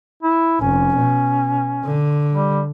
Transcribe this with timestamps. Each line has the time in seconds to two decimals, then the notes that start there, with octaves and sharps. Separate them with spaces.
0.23 E4
0.61 F1 C#4
0.97 B2
1.85 D3
2.32 G3